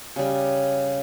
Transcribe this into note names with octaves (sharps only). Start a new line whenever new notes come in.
C#3 G3